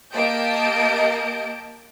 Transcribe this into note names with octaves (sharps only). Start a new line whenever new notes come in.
A#3 G4 D#5 A5 G6 D7